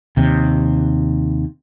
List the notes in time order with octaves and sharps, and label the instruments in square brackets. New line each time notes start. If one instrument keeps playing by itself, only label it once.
[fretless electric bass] D#2 C3